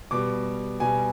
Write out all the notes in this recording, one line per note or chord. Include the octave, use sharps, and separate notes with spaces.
B2 G3 D6
B2 G3 G#5